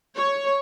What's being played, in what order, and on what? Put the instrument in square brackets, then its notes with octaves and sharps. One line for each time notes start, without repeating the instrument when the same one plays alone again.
[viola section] C#5